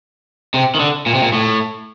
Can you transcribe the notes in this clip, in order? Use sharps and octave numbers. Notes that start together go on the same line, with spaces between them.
C3
D#3
D3
A#2
C3
A#2
A2